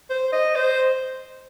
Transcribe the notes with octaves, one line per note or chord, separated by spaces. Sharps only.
C5
D#5
C5